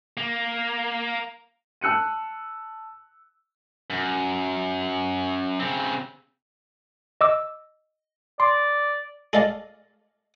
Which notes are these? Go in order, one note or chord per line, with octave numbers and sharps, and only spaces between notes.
A#3
A5 E6 F#6 C#7 D#7
F#2
C#3 C4
D#5 D6 E6
D5 C6
G#4 A4 D5 D#5 F5 A5